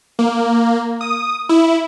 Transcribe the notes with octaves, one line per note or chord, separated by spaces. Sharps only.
A#3
D#6
E4